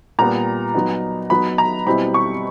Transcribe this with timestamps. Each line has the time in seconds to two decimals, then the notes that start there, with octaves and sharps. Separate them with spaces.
0.19 A#2 G3 B3 A#5
0.74 F#3 B3 D#4
1.30 F#3 B3 D#4 B5
1.58 A#5
1.86 B2 G3 C4 E4 B5
2.14 C#6